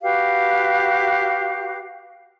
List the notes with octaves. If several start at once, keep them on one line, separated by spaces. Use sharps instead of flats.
F#4 G4 B4 F5